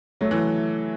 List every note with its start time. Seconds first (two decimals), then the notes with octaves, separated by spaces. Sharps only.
0.21 F#3 A3
0.31 E3